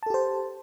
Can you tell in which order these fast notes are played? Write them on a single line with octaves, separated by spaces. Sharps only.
A5 A4 G4 C5